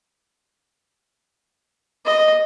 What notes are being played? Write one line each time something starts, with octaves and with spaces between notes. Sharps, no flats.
D#5